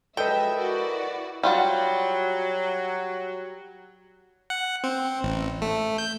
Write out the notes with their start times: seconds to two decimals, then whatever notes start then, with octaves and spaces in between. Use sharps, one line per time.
0.17 F3 F#3 G#3 A4 B4 D#5 E5 G5
0.55 E4 F#4 A#4 D5
1.43 F#3 G3 F4 F#5
4.50 F#5
4.84 C4
5.23 A1
5.62 A3
5.98 G6